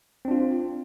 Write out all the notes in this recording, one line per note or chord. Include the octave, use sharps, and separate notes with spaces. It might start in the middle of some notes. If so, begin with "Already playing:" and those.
C4 D4 F4